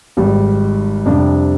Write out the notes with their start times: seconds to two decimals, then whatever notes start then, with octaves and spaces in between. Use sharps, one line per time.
0.17 G#1 G#2 G3
1.06 F2 C3 G3 D4